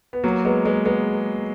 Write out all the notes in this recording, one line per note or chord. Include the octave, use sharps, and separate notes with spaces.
B3
F#3 A#3
G#3 B3
G#3 B3
G#3 B3